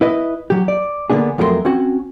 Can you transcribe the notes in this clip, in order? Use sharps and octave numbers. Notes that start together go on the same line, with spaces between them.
E4 B4 D#5
F#3 G4
D5
D3 A#3 B3 D4 G#4
F2 F#3 A3 F4 A#4 C6
C4 C#4 F#4